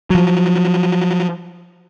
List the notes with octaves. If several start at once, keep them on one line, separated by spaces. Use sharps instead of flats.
F3 F#3